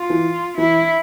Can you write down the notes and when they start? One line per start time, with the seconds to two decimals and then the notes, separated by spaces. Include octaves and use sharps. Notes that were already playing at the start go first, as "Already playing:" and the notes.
Already playing: F4
0.10 E3
0.58 E3 E4